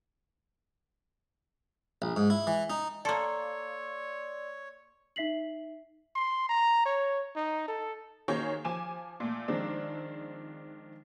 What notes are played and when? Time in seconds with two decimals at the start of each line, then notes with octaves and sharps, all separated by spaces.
2.02 A#1
2.16 G#2
2.30 E4
2.47 E3
2.70 D#4
3.05 A#3 A4 C#5 D5 C6 E6
5.16 D#4 E5 B6 C7 F#7
6.16 C6
6.49 A#5
6.85 C#5
7.36 D#4
7.68 A4
8.28 D#3 A#3 F#4 G#4 C5 C#5
8.65 F3 G#5 D6 E7
9.20 A#2 A3
9.48 D#3 F3 G#3 C4 D4